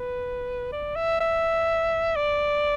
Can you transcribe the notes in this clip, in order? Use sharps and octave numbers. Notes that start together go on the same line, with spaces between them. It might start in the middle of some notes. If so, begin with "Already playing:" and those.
Already playing: B4
D5
E5
E5
D5